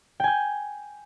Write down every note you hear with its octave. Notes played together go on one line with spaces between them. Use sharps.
G5 G#5 G6